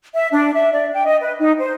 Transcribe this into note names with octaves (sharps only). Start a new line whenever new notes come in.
E5
D4
E5
D5
G5
D#5
B4
D#4
C5